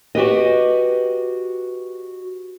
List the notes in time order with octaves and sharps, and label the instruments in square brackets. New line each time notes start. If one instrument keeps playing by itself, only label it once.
[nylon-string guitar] F#4 G4 B4 D#5